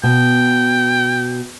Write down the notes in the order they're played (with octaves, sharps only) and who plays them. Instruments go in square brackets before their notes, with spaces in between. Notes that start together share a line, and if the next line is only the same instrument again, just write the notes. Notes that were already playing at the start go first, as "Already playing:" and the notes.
[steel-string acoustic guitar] B2 [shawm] G5